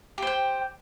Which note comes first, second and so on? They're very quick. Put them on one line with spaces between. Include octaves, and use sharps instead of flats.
G4 C5 G5